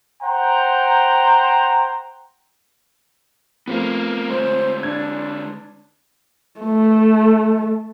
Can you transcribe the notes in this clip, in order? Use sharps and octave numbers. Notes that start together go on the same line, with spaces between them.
C5 F#5 G5 A#5
F3 A3 B3 C4 A#4 F5
D3 G#3 C5
D4 G#6
A3